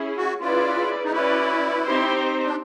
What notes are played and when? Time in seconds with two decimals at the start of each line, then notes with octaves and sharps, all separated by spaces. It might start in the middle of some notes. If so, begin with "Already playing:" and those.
Already playing: C#4 E4 G#4
0.17 F#4
0.40 C#4 E4 F4 G#4 B4 D5
1.04 D#4
1.12 C#4 E4 F#4 B4 D5
1.84 C4 D#4 G4 C5
2.44 D4